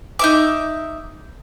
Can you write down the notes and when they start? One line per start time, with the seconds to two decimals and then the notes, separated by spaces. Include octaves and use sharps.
0.19 D#4 E5 D6